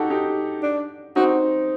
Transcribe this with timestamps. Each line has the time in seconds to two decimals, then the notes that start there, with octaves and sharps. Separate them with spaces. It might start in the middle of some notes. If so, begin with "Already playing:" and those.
Already playing: D#4 F#4 G4 A4
0.10 D#4 G4
0.63 D4
1.16 C4 D#4 F#4